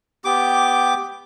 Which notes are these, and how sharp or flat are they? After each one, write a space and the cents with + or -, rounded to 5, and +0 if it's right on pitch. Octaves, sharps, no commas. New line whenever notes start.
B3 +10 G4 +0 D6 +0